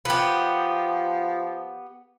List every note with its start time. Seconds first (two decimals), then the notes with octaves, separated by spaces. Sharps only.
0.05 F3 B3 G4